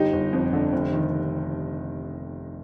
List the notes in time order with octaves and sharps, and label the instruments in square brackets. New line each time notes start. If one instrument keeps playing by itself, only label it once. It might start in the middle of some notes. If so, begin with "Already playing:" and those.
Already playing: [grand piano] G1 D#4 G4
G1
F2
D3
F1
D#3